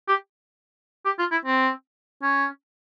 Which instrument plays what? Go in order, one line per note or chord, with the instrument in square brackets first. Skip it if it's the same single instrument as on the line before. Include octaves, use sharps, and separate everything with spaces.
[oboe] G4
G4
F4
E4
C4
C#4